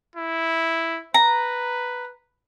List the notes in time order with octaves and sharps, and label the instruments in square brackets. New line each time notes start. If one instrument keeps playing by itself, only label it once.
[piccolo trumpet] E4
[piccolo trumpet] B4 [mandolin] A#5